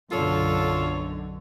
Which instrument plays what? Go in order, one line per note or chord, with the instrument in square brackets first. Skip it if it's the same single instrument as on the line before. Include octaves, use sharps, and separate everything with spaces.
[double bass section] B1 F#2 D3 [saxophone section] F4 A4 C#5